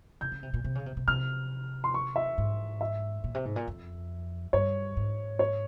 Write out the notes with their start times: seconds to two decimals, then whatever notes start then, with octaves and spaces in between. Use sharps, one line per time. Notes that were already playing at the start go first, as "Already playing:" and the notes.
0.21 C#3 G6
0.32 C#3
0.43 C3
0.54 A#2
0.64 C3
0.75 C#3
0.86 C3
0.97 C3
1.08 C3 F6
1.84 C6
1.94 C#6
2.16 E5
2.38 G#2
2.81 E5
3.24 A#2
3.34 C3
3.45 G#2
3.56 A#2
3.67 F2
4.53 G2 C#5
4.97 G#2
5.39 C#5